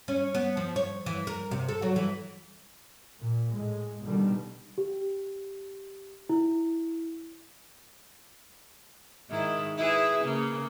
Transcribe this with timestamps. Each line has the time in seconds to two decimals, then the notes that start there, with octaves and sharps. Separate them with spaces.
0.08 C#4
0.35 B3
0.57 F3
0.76 C#5
1.06 E3
1.27 A#4
1.51 C3
1.69 A4
1.82 F#3
1.96 E3
3.19 A#2
3.50 A2 G#3
4.02 B2 D3 D#3 G3
4.78 G4
6.29 E4
9.30 G#2 D#3 E4
9.78 E4 G#4 B4
10.24 C#3 A#3